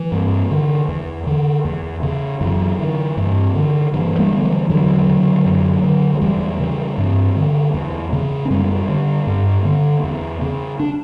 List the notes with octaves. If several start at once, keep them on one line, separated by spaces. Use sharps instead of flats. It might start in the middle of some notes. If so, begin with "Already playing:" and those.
Already playing: E3
G2
D3
E2
D3
E2
C#3
F#2 E3
D3
G2
D3
G2 E3
G3 B3
D3
F#3
E3 G3
E2 D3 F#3
C#3
F#2
D3
F#3
E2 E3 G3
C#3
G2
D3
E2
C#3
C#4
F#2 G3 B3
D3
G2
D3
E2
C#3
D4